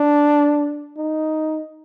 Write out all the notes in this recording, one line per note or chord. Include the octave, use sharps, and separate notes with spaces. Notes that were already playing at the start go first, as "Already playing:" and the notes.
Already playing: D4
D#4